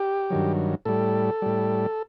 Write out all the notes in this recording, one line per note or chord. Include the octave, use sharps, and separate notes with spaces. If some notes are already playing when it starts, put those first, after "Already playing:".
Already playing: G4
G2 D#3 F#3
A2 G3 A4
A2 G3